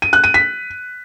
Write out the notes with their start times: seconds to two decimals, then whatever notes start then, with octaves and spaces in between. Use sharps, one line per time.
0.02 D#7
0.13 F#6
0.24 D#7
0.34 B6